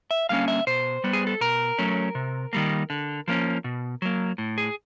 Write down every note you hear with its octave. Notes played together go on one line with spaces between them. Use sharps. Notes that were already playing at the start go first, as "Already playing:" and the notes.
E5
D3 G3 A#3 C#4 F5
E5
B2 C5
G3 B3
G#4
A4
B2 A#4
F#3 A3 C#4
C3
D#3 G3 A#3
D3
F3 A#3 C#4
B2
F#3 A#3
A2
G#4